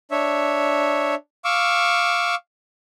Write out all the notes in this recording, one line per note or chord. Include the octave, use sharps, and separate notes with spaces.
D4 C#5 E5
F5 C#6 D6 E6